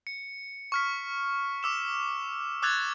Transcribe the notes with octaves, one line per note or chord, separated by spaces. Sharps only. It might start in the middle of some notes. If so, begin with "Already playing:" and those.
C#7
C#6 F6 B6
D6 E6 E7
D6 E6 F#6 G#6 A6 F7